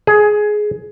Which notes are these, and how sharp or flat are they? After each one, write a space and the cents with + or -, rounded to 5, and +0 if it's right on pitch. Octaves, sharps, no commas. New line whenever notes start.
G#4 +15